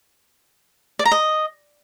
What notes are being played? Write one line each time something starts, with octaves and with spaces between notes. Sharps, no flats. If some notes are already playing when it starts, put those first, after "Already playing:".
D5
A#5
D#5